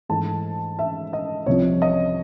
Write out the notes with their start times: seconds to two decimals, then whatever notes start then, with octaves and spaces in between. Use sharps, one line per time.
0.09 G#2 E3 A3 A5
0.79 E5
1.13 D#5
1.46 C2 C3 F3 C#5
1.82 D#5